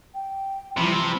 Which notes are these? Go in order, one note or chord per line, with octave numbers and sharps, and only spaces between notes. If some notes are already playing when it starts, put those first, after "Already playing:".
G5
C3 E3 F3 G3 B5